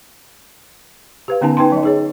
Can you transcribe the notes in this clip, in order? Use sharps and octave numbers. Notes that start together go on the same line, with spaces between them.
G4 B4 F5
D3 B3 C#4 D#4 G#5 A5
D#4 B4 G5 A5 C6
F#3 D#5
D#4 G#4 C#5